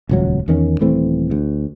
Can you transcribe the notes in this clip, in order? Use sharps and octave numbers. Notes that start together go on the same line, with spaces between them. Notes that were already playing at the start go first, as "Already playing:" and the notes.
D#1 C#2 F#3
E2 D#3 C4 C#4
D#1 E3 A3 C4
D2